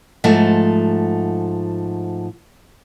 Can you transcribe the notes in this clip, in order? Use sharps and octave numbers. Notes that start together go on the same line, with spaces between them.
G#2 F3 A3